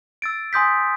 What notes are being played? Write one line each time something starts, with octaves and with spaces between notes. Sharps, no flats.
E6 A6 D7
G#5 C6 D#6 G6 B6